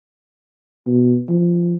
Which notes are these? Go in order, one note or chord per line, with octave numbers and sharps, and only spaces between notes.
B2
F3